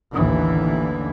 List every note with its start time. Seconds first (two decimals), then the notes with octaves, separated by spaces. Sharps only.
0.13 A1 D#2 D3 E3